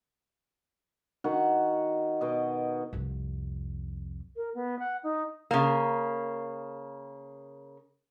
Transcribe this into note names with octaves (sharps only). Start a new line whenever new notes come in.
D#3 D#4 F#4 F#5
B2 D#5
C2 F2
A#4
B3
F#5
D#4
C#3 A#3